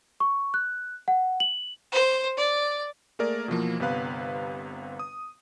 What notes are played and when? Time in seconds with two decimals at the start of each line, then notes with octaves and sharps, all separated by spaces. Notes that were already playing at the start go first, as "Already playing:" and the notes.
0.20 C#6
0.54 F#6
1.08 F#5
1.40 F#7
1.92 C5
2.37 D5
3.19 A3 A#3 G#4 A#4 D5
3.48 B2 E3 F3 A#3
3.80 G1 C3 B3 B4 F5 F#6
4.99 D#6